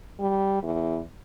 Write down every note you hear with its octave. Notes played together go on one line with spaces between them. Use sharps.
G3
E2